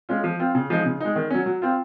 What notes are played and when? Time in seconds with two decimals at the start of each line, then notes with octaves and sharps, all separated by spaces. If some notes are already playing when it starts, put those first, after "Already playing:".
0.09 G#3 C#4 F4
0.24 F3
0.39 C4 F4
0.55 C#3
0.70 F3 G#3 D#4
0.85 C#3
1.00 G#3 D#4
1.16 D#3
1.30 F#3 C#4
1.46 F#3
1.62 C4 F4